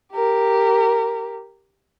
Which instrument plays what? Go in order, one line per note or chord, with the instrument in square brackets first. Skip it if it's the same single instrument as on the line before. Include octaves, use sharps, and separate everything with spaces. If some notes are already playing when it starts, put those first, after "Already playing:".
[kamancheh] G4 A#4